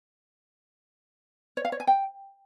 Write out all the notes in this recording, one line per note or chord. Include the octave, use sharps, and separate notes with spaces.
C#5
F5
C#5
G#5
G5